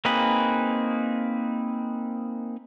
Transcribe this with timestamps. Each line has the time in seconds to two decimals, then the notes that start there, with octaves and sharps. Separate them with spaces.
0.05 A#3 C4 D#4 G#4 B4